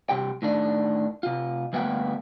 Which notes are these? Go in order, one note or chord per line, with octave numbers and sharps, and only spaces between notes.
G2 C3 G4 G5
A2 D#3 D4
C3 F4
D2 G2 A#3 B3 E5 G5